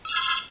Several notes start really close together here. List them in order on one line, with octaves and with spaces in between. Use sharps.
E6 F6 G#6 C6